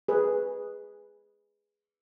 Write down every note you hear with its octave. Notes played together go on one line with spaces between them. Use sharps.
G#4 B4